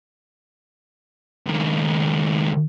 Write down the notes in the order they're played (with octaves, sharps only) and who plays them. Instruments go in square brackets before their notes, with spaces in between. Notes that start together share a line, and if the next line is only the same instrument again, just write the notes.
[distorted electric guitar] C#2 D#3